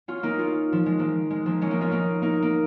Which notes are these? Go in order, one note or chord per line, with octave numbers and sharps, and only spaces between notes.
C#4 F4
A#3 D#4
C#4 F4
F3
G#3
F3 A#3
G#3
F3 A#3
G#3 C#4
A#3 D#4
C#4 F4
A#3 D#4
A#3 D#4
A#3